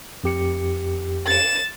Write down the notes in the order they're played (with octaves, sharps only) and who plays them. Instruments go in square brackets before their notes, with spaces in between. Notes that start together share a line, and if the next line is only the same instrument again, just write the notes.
[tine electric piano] F2 G4 C#7
[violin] A6 E7